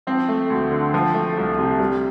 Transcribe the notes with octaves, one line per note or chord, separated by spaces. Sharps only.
F3 C4
A3
D2
D3
F3
A3
C2
C3
G3